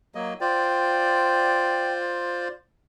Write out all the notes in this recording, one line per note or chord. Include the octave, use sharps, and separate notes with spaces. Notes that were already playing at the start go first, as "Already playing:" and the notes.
F#3 A#3 D#5
F4 C5 D5 G5